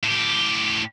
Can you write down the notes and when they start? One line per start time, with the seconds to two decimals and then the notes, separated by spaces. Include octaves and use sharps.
0.03 A2 G4